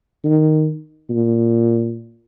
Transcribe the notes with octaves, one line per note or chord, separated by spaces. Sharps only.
D#3
A#2